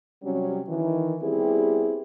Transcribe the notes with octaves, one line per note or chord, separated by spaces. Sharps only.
C3 F#3 G3 C4 C#4
D#3 E3
G3 B3 C4 E4 G4 G#4